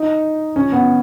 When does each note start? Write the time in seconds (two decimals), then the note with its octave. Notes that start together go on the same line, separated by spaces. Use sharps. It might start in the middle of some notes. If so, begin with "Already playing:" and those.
Already playing: D#4
0.56 C#4
0.72 B3